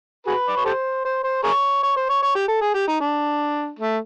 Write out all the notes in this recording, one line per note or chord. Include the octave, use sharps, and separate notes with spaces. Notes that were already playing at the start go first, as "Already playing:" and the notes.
F#4 G#4 B4
D5
C#5
G4 A4 C5
C5
C5
G#4 A#4 C#5
C#5
C5
C#5
C#5
G4
A4
G#4
G4
D#4
D4
A3